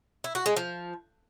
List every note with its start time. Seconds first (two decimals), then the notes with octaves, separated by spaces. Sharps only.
0.24 E4
0.35 F#4
0.46 G#3
0.56 F3